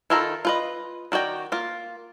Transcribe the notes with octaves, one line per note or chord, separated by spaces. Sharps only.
D#3 E4 F4 A4 A#5
F4 B4 D#5
D#3 F#4 D5 G5 A#5
A#3 F4